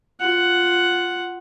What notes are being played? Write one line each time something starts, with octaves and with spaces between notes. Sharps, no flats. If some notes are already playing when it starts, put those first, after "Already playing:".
F4 F#5